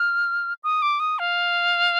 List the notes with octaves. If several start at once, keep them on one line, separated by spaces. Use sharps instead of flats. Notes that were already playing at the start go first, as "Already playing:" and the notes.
Already playing: F6
D#6
D6
D#6
F5